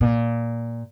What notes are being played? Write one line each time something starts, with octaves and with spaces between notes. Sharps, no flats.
A#2